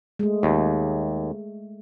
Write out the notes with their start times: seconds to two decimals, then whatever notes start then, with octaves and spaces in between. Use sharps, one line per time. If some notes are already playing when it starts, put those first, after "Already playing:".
0.19 G#3 A3
0.43 D#2